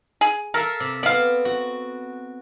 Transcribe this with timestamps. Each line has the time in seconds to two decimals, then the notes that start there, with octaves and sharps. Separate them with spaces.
0.21 G#4
0.54 A4 A#4 E5 F5
0.80 C3
1.03 B3 C4 D5 F5
1.45 F#4